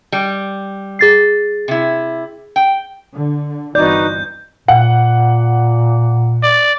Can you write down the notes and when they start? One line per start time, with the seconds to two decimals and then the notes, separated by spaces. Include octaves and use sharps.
0.12 G3
0.99 G#4 A6 C7
1.68 C3 E4
2.56 G5
3.14 D3
3.75 G1 E3 C4 D#4 F#4 B4 D5 G6
4.68 A#2 F#5
6.43 D5